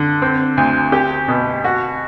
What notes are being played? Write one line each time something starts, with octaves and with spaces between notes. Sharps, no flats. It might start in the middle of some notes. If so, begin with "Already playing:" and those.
Already playing: D3
C4
D2
G4
B2
F#4